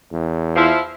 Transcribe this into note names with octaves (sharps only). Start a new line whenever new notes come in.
E2
F3 E4